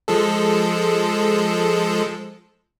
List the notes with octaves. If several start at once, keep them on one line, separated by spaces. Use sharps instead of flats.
F3 G#3 A4